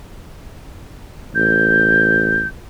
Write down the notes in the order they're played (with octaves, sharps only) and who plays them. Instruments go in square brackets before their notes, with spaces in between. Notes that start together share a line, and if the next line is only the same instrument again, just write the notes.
[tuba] A1 [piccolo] G6